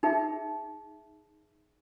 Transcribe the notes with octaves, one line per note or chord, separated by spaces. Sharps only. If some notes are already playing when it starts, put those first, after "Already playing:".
D#4 G#4 E5